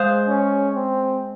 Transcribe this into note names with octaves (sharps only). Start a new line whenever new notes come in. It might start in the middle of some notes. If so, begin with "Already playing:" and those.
Already playing: G#3 G#4 C5 F5
C#4
C4